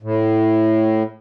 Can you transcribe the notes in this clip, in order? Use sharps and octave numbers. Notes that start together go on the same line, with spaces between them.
A2